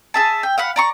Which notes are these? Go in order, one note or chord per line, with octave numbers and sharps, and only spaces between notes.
G#4 E5 A5
G5
F5 F#5 B5
D5 A#5 C#6